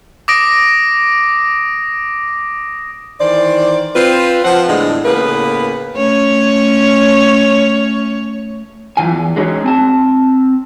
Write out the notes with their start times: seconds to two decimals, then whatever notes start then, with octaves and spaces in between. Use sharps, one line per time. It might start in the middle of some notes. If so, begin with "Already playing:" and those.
0.28 D6 D#6 A#6 D7
3.20 D#3 E3 C5 D5
3.95 C4 F4 B4
4.45 F3 C4 F#5
4.68 E2 A2 D3 G#3 A3 D4
5.05 A2 C#3 A#3 B3 B4
5.97 A3 C#4 C#5
8.97 F#2 A#2 E3 F3 F4 G#5
9.10 E2
9.36 G#3 A#3 C#4 D#4 F#4 C#5
9.64 C4 G#5 A5